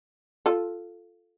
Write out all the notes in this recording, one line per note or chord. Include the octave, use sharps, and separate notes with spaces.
F4 A4